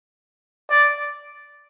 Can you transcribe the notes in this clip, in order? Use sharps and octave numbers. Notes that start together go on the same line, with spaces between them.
D5